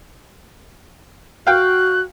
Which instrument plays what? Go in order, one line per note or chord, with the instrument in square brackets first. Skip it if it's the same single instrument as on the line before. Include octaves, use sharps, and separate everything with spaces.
[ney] F#4 [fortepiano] F5 G5 [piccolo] F#6